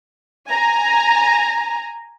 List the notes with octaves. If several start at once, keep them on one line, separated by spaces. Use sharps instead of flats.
G#5 A#5